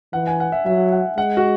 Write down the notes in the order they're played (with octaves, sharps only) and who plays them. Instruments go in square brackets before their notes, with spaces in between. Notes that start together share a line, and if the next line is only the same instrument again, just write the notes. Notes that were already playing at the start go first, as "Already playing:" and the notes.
[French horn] E3 [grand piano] F#5
[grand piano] G#5
F#5
E5
[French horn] F#3 [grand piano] E5
[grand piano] F#5
[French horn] G#3 [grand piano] F#5
[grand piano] F#4